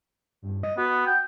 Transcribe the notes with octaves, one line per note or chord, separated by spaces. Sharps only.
G2
D#5
B3 F#4
G5